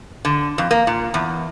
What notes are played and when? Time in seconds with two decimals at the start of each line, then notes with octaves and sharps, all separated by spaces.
0.25 D3
0.58 F2
0.71 A#3
0.87 A#2
1.14 E2